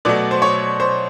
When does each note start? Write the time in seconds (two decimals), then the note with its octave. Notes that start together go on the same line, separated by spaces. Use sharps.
0.05 B2 F#3 A3 D5
0.31 C5
0.42 C#5
0.80 C5